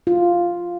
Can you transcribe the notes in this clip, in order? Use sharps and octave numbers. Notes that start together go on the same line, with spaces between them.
F4